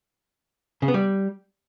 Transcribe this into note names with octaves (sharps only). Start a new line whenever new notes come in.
C#3
B3
G3